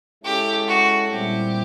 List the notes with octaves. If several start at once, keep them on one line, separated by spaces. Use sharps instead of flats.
G#3 C#4 E4 G4 A4
F#4
A#2 G3 C4 E4 G4